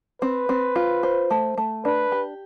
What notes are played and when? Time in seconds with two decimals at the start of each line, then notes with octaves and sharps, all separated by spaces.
0.21 C4 B4
0.49 C4
0.76 F4
1.03 C5
1.31 A3
1.58 A3
1.85 D4 B4
2.12 G4